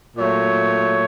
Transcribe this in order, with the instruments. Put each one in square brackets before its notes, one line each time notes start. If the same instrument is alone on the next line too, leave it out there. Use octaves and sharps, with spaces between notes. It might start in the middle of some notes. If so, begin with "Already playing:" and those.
[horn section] A#2 F#3 A3 C#5